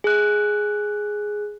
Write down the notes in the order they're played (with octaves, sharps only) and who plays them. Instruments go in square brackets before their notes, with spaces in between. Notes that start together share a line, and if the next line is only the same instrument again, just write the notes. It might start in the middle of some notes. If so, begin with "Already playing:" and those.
[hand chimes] G#4 F#6